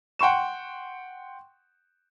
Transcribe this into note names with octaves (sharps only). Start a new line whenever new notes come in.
F#5 G5 C6 C#6 E7